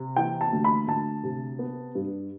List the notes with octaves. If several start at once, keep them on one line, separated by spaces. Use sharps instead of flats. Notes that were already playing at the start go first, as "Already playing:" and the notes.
Already playing: C3
E3 G5
A5
D2
B5
D2 A5
C3
B3
G2